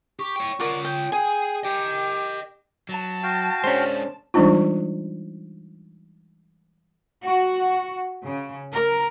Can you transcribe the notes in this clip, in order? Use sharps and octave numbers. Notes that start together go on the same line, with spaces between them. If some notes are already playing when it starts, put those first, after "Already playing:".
G4 C#6
C#5 G5
F4 A#4 C#5 D5 F#5
G5
G#4 G5 G#5
G4 D#5 G5
F#3 A5
F#4 F5 G5
G#3 C#4 D4 C5
E3 G3 G#3 D4 D#4 F4
F#4
C#3
A#4